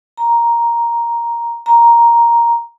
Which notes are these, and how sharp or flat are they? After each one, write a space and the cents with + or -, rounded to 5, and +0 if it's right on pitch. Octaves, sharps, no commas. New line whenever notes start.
A#5 +5
A#5 +5